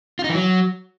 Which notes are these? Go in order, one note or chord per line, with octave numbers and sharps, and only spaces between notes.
F4
D#4
E3
F#3